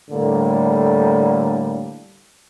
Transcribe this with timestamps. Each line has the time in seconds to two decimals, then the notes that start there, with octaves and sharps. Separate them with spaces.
0.10 A2 D3 G3 A#3